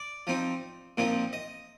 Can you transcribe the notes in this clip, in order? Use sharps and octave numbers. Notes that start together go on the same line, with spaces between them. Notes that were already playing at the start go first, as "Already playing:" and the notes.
Already playing: D5
F3 C4 D#4
A#2 F3 C4 D#4
D#5